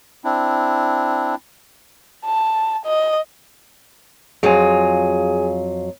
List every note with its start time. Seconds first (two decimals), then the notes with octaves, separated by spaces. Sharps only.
0.24 C4 D4 E4
2.25 A5
2.86 D#5
4.43 F2 F#3 F4 G#4 G#5